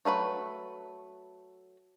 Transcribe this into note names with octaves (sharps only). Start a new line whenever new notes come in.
F#3 A3 B4 B5